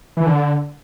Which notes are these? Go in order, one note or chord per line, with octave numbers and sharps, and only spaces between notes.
E3
D3